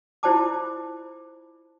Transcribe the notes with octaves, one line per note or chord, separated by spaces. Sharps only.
E4 F4 C5 D5 A5 D6